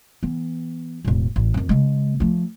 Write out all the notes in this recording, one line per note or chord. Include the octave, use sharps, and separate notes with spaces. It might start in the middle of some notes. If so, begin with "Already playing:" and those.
E3 B3
E1 A2
A1
F2 D#3
C#3 G#3
F3 A3